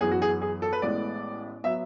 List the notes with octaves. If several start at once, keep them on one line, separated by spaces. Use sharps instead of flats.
F#2 E3 B3 G#4
F#4
G#4
G#4
A4
B4
A1 A2 G#3 B3 D5
F#3 B3 E5